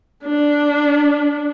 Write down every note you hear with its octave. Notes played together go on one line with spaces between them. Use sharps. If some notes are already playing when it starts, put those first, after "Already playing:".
D4